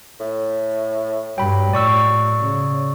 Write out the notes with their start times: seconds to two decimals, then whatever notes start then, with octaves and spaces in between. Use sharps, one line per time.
0.20 A2
1.38 G2 F#3 G5 B5
1.73 A2 D5 C#6 E6
2.41 C#3